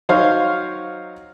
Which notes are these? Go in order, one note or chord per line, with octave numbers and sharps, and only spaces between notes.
F#3 D#4 C5 C#5 F5